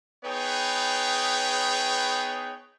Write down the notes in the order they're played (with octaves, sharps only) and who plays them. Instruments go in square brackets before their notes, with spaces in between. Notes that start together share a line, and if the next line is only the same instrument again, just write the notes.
[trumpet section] B3 D#4 G#4 B4 C#5 G5